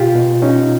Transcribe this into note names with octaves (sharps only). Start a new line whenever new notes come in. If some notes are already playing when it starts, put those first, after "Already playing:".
Already playing: B2 F4 G4
B2
B2 C#4 D#4